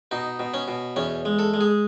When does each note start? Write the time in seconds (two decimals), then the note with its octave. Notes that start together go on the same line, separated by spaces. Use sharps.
0.11 B2 D#4
0.40 B2
0.54 C#4
0.68 B2
0.96 E2 C#4
1.25 G#3
1.39 A4
1.54 G#3
1.61 G#4